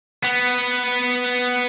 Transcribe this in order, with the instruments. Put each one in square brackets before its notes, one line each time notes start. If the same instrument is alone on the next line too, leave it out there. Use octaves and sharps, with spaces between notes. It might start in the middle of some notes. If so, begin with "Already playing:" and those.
[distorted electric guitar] B3